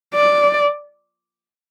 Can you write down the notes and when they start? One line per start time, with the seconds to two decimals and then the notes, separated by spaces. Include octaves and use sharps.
0.15 D5